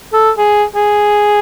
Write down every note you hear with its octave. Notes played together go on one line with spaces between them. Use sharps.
A4
G#4
G#4